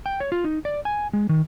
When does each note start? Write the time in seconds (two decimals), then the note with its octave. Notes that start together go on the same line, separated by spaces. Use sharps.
0.06 G5
0.20 C#5
0.32 F4
0.44 D#4
0.65 D5
0.85 G#5
1.13 G#3
1.29 D#3